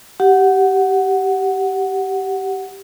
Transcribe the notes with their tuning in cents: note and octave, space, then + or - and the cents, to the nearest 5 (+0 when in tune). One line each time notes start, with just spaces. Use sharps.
G4 -15 F#5 +0